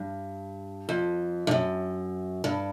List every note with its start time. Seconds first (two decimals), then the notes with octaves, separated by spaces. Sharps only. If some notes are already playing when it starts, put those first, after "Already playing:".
Already playing: G2
0.89 F2
1.47 G2
1.51 F#2
2.44 G2